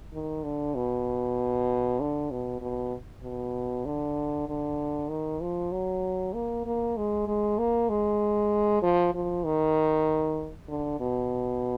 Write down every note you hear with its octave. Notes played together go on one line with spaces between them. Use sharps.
D#3
D3
B2
D3
B2
B2
B2
D3
D3
D#3
F3
F#3
A#3
A#3
G#3
G#3
A#3
G#3
F3
F3
D#3
D3
B2